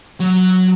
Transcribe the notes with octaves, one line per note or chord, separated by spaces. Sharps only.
F#3